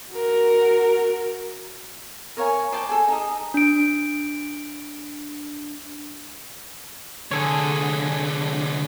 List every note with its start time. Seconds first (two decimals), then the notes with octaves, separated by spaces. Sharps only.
0.12 F#4 A#4
2.37 A#4 C#5 F5 G#5
2.72 C5 D5 G5 A5
2.89 G#4 A4
3.08 D#4 G#4
3.54 D4 D7
7.31 C2 D3 G#4 A4 C#5